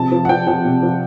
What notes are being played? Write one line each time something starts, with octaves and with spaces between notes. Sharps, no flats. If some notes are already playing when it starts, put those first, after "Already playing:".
Already playing: C3 F3 A5
F3
F#5
F3 G5
F3 G5
C3
F3